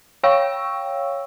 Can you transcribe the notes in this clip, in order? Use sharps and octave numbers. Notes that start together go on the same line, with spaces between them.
C#5 F5 G5 C#6 E6